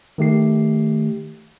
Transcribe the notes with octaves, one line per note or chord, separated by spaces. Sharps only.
D#3 A3 G4 C7